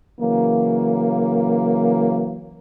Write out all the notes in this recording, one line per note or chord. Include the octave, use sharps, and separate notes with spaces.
C#3 E3 F#3 A#3